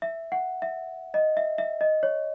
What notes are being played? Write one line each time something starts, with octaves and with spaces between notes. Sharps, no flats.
E5
F#5
E5
D#5
E5
E5
D#5
C#5